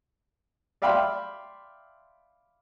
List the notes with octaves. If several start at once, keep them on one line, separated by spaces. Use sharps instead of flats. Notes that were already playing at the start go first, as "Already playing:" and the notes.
D5 E5 F5 G5 B5 C6